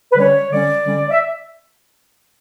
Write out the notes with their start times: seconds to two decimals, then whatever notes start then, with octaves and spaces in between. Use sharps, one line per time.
0.12 B4
0.17 D3 G3 C#4 C#5
0.51 D3 G3 C#4 D5
0.85 D3 G3 C#4
1.11 E5